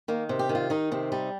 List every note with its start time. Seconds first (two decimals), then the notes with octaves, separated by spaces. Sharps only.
0.08 D#3 A#3
0.29 C3
0.39 G4
0.49 D#3
0.55 F4
0.70 D#3 D#4
0.92 C3 C4
1.12 G3 D#4